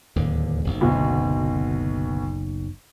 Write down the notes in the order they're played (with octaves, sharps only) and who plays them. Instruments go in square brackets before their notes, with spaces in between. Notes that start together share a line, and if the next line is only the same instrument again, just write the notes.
[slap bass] D1 D#2 D3
F#1 B1
[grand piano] D2 B2